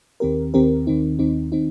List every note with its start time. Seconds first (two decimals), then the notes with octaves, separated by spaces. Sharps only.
0.20 D#2 D#3 C4 G4 A#4
0.54 D#2 D#3 C4 G4 A#4
0.87 D#2 D#3 C4 D#4
1.19 D#2 D#3 C4 D#4
1.52 D#3 C4 D#4